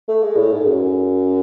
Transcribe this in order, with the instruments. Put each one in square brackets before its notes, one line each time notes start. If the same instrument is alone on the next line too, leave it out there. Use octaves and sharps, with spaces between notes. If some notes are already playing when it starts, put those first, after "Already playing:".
[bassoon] A3
G#3
A2
G#2
F#2